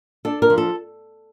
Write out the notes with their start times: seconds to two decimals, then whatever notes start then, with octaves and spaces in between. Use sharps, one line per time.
0.25 D4 A4
0.42 A#4
0.50 F3
0.58 A4